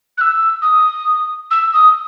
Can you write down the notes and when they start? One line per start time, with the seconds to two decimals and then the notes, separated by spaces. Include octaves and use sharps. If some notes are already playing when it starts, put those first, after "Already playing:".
0.17 F#6
0.21 E6
0.62 D#6
1.51 E6
1.73 D#6